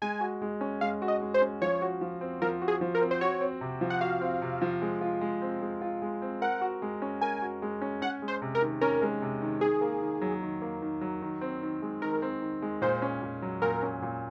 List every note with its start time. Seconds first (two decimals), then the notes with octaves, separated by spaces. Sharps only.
0.02 G#3 G#5
0.21 F#4
0.42 G#3
0.61 C#4
0.81 G#3 F5
1.02 F#4
1.08 D#5
1.22 G#3
1.34 C5
1.41 C#4
1.62 F3 C#5
1.82 F#4
2.01 F3
2.21 C4
2.42 F3 A#4
2.62 F#4
2.68 G#4
2.81 F3
2.95 A#4
3.01 C4
3.11 C5
3.21 F#4 C#5
3.41 C4
3.61 C3
3.81 F3
3.90 F#5
4.01 F#4 F5
4.21 C4
4.42 C3
4.62 F3
4.82 G#3
5.01 F4
5.21 G#3
5.42 C4
5.61 G#3
5.81 F4
6.02 G#3
6.22 C4
6.42 A#4 F#5
6.61 F#4
6.82 G#3
7.02 C#4
7.21 A#4 G#5
7.42 F#4
7.62 G#3
7.82 C#4
8.02 C#4 F#5
8.22 G#3
8.28 C5
8.42 C3
8.55 A#4
8.62 D#3
8.81 C#4 A#4
9.02 G#3
9.22 C3
9.42 D#3
9.61 D#3 G#4
9.81 A#3
10.02 D#3
10.21 F#3
10.42 D#3
10.62 A#3
10.82 D#3
11.01 F#3
11.22 D#3
11.41 C4
11.62 D#3
11.82 G#3
12.02 D#3 A#4
12.22 C4
12.42 D#3
12.62 G#3
12.82 A#2 C5
13.02 C#4
13.22 A#2
13.42 F#3
13.62 A#2 A#4
13.82 C#4
14.02 A#2